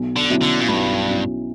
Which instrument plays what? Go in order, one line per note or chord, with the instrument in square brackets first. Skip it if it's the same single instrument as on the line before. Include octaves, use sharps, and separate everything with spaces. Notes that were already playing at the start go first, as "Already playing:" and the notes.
Already playing: [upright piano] B1
[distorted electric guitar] D3
[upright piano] B2 F#3 C#4 E4
[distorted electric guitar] D3
A#2
[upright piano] B1 [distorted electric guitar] G2
[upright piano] B2 F#3 C#4 E4